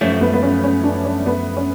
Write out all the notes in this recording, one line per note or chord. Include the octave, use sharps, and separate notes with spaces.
F#2 F3 A3 C#4
B3
B3
C#4
C#4
D4
C#4
B3
C#4